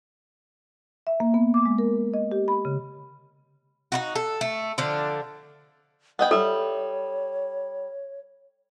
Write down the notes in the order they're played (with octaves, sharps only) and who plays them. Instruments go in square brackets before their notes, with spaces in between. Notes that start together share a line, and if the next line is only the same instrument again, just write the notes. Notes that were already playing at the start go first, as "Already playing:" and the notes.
[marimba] E5
A#3
B3
D6
G#3
A#4
D#5
G4
B5
C#3
[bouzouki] D#4 E4 F#4
A4
A3
D3 F3 D4
[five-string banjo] B3 D#5 G5 [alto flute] F#5
[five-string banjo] G3 E5 [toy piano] A4 [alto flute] C#5